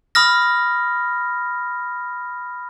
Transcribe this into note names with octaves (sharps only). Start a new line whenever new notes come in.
B5 D#6 F6 A#6